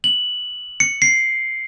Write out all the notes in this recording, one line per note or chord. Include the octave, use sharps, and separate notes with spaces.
F#7
C#7
C7